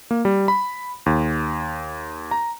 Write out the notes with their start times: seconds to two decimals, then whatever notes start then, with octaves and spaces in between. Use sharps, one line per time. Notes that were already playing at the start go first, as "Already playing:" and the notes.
0.11 A#3
0.25 G3
0.48 B5
1.06 D#2
2.31 A#5